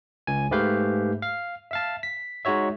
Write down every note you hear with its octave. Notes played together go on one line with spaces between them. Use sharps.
C#2 G#5
G#2 A3 G4 B4 F5 G6
F5
E5 F5 A5
B6
G#3 D#4 F#4 C#5 E5